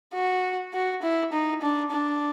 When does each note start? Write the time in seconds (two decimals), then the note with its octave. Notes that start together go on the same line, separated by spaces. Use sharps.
0.14 F#4
0.74 F#4
1.02 E4
1.33 D#4
1.62 D4
1.91 D4